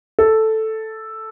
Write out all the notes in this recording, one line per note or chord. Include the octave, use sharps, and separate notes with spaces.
A4